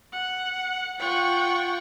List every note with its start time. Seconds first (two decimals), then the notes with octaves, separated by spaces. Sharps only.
0.12 F#5
0.99 F4 F#5 G5 C#6